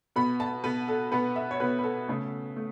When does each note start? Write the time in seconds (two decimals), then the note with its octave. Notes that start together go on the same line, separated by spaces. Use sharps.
0.16 B2 B3 B5
0.40 A5
0.64 B2 B3 B4
0.88 A4
1.12 B2 B3 B4
1.36 E5
1.51 C#5
1.60 B2 B3 B4
1.79 B4
1.84 A4
2.08 C#3 A3
2.56 A3